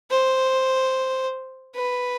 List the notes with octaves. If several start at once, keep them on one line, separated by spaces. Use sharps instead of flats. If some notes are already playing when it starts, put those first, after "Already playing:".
C5
B4